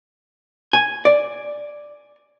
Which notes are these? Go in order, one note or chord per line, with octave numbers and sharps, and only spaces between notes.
G#5
D5